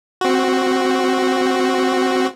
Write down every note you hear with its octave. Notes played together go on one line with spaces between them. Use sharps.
C4 F#4